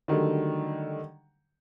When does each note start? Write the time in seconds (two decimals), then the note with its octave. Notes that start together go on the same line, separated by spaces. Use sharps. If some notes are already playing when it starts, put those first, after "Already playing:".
0.08 D3 D#3 F#3 G3 A3